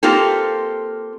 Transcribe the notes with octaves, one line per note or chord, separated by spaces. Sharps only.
A#3 C4 F4 G4 A4